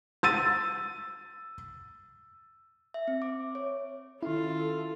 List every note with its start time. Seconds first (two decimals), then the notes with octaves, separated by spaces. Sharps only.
0.23 E6 A6 D#7
2.94 E5
3.08 C4
3.22 D6
3.55 C#5
4.23 D#3 C#4 E4 F4 A4